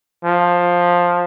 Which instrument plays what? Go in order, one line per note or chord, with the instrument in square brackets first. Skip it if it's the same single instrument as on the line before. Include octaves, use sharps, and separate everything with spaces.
[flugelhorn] F3